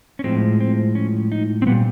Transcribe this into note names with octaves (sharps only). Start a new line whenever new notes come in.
C#4
A2 F3 G#3 C4
C4
C#4
D#4
C4
A#2 G3 B3